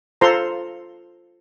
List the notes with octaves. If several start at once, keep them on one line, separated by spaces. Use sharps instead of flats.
F4 A4 C5 A#5 C6